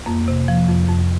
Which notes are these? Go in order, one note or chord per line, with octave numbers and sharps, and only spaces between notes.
F2 A#3
C3
F3
F2
F2